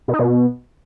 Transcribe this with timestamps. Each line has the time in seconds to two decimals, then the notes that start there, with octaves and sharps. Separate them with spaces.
0.08 B2
0.14 D#4
0.19 B2